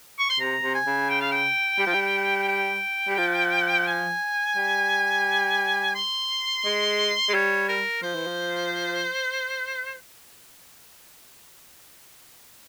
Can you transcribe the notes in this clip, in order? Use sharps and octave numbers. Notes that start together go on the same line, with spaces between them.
C#6
C6
C3 A#5
C3
G#5
C#3
G5
F5
G5
G3
F3
G3
G5
G3
F3
G#5
G3
C6
G#3
G#3
G3 C#5
A#4
F3 C5
E3
F3